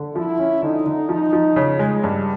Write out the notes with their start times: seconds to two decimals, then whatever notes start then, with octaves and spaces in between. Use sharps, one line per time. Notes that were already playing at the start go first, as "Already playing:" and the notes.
Already playing: D3
0.16 F3 E4
0.39 C#4
0.63 D3 D#4
0.86 D3
1.09 F3 D#4
1.33 F3
1.56 C#3
1.79 G#3
2.04 G2